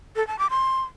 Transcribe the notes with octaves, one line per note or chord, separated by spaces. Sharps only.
A4
A5
D6
C6